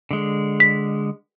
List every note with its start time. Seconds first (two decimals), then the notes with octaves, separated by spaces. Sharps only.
0.11 D3 G#3
0.60 B6